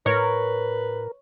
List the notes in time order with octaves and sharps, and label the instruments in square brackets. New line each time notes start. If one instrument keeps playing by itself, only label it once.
[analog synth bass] A2 [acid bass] A#4 [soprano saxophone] B4 [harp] C#5